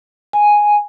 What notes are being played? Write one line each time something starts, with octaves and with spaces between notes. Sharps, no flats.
G#5